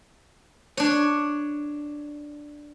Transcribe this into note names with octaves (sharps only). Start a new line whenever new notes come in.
D4 C#5